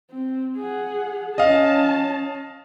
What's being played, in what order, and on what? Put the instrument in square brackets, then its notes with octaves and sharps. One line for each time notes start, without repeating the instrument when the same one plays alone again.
[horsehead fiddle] C4
G#4 F#5
[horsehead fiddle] C#4 A5 [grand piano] D#5 F5